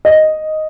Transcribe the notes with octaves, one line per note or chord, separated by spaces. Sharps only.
D#5